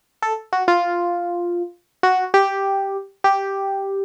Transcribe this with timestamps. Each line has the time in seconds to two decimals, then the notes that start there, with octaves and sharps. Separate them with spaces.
0.22 A4
0.53 F#4
0.68 F4
2.03 F#4
2.34 G4
3.24 G4